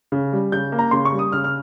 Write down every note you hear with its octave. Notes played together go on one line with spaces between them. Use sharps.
C#3
G3
C#3 G6
A#3
A#5
C#3 C6
C#6
G3
D#6
C#3 F6
F6